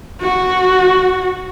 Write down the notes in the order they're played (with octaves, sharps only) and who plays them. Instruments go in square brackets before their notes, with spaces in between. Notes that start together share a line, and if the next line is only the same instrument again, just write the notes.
[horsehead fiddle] F#4